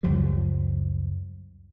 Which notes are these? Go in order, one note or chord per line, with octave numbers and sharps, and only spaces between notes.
C#2 F#2 F3 G3